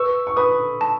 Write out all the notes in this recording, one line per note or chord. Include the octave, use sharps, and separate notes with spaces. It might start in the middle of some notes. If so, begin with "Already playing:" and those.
Already playing: B4 C#6 E6
C#6
B4 B5 D#6
A5